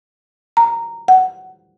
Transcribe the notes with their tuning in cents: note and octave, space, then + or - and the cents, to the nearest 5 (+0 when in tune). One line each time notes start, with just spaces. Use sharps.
A#5 -10
F#5 +10